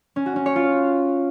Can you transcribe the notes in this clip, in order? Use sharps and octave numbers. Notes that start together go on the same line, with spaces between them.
C#4
F#4
C#4
C#5
F4